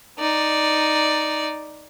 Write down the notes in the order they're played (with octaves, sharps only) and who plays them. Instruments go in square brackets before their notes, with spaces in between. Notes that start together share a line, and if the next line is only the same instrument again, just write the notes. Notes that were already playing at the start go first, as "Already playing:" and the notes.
[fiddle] D#4 D5